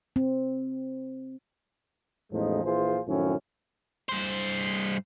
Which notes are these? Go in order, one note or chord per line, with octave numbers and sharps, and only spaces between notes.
C4
A1 E2 A2 F3 G#3 D#4
A#1 E3 F3 F4 G#4 C5
F#2 A2 D#3 F3 C4 C#4
G2 C5